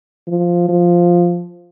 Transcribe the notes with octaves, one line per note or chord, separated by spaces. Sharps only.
F3
F3